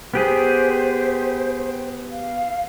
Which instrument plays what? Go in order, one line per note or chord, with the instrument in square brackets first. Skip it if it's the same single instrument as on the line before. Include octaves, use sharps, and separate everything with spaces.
[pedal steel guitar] B3 G4 G#4 [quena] C5
[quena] F5